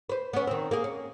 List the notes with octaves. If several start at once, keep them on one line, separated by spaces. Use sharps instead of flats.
B4 C5
B3 C#4
D#3 C4
A#3 G#4
C#4